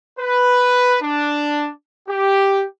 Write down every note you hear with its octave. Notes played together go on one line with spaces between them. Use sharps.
B4
D4
G4